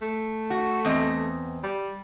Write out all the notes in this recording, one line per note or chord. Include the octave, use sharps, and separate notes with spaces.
A3
F#4
E2 C4 D#5
G3